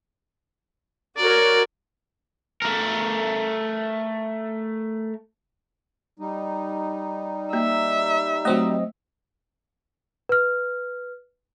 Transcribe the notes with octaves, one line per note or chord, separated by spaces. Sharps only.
F#4 A#4 C#5 D5
A3 A#4
G3 D#4
A#3 E5
F#3 A3 C4 D#5
B4 F6